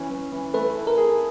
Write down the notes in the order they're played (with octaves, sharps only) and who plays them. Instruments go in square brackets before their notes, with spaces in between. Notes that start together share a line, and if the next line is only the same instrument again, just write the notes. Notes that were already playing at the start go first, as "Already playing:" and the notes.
Already playing: [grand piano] E3 C#4
E3
E3
[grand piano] A3 [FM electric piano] B4
[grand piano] E4
[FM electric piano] A#4
[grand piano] G#4